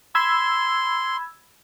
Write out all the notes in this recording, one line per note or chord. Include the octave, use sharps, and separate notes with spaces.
B5 C6 E6 G#6